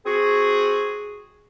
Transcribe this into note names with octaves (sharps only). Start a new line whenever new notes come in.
C4 F#4 G#4